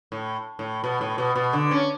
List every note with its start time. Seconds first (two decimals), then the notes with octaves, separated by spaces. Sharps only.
0.12 A2
0.59 A2
0.84 B2
1.01 A2
1.18 B2
1.36 B2
1.53 D3
1.71 C#4